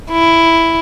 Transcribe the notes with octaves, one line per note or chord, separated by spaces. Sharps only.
E4